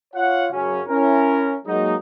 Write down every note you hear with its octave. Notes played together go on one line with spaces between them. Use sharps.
F4 C#5 F5 F#5
F#2 C#3 F#3 C#4
C#4 E4 A#4
F#3 G#3 A#3 D#4